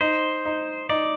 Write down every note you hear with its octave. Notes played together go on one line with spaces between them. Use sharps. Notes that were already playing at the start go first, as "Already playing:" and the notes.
D#4 C5
D#4
D#4 D5